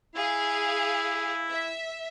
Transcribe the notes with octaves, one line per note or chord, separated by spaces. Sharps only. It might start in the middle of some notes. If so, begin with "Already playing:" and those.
E4 G#4 F5
E5